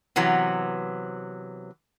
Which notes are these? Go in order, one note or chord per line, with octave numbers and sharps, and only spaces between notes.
C3 E3 F#3 B3